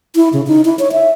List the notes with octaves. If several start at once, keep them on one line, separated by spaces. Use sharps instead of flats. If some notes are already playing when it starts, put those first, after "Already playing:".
E4
C#3
D#4
E4
C#5
E5